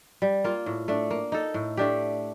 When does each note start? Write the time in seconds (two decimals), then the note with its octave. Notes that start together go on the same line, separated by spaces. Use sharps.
0.22 G3
0.44 A#3 F4
0.66 A2
0.88 A3 D4
1.11 A#3
1.32 D#4 A4
1.54 A2
1.77 A3 D4 G4